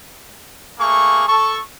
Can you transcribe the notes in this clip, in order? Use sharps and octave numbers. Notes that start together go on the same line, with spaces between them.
A3 A#3 G#4 C#6
A4 C#6